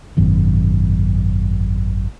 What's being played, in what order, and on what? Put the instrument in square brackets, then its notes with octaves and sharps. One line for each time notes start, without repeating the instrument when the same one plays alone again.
[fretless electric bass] G#1 F#2 B2 D#3